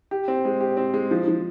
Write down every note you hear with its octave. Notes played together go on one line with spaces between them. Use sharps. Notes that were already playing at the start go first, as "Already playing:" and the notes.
G4
C4
G#3
G4
C4
G#3
F3
F3